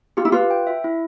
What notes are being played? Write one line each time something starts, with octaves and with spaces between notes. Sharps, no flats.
F4 G4
E4
F4 B4
G5
E5
E4